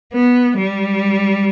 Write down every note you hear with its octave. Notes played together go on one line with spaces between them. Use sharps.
B3
G3